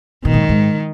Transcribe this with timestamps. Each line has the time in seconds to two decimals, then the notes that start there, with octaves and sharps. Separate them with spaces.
0.25 B2 D#3
0.34 G#2
0.41 F#2
0.49 G#2